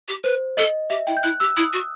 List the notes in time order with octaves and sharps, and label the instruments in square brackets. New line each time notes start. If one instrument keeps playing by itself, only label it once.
[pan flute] G4
[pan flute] B4 [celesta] C5
[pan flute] A4 [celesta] D#5
[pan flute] G4 [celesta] E5
[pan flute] E4 [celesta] G5
[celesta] G6
[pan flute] E4 [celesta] F#6
[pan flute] G4 [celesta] E6
[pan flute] E4 [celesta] D#6
[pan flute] F#4